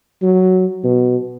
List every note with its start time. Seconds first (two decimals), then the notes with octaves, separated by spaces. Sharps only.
0.22 F#3
0.84 B2